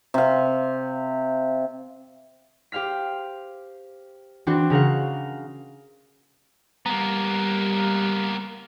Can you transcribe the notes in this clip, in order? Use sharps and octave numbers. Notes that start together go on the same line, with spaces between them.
C3 F5
G4 C5 F5 F6 B6
E3 C4 D4 F#4 C5
C#3 A#4 F5 F#5
G3 A#3 B3 A#5